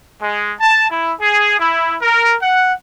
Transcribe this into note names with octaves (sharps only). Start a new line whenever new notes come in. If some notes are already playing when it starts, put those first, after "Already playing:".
G#3
A5
E4
G#4
E4
A#4
F#5